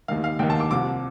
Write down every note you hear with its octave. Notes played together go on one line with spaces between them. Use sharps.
D#2 D#3 F5
F5
D#2 D#3 G5
A5
D6
C2 C3 F3 D6